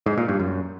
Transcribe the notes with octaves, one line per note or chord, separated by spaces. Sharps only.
G#2
A#2
G2
F#2